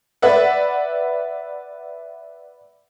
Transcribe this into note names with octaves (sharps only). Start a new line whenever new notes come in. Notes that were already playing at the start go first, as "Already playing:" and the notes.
B4 D5 E5 F#5